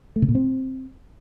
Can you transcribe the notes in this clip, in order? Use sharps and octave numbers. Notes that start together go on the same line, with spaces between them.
A3
C3
A#2
C4